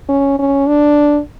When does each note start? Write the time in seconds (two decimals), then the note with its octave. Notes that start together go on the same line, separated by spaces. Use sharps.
0.09 C#4
0.39 C#4
0.67 D4